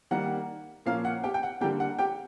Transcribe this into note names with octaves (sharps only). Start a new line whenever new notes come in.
D#3 G3 A#3 F#5
A#2 F3 A#3 C#4 F5
F#5
G4 G5
G5
F#5
D3 G3 A#3 G4 G5
F#5
G4 G5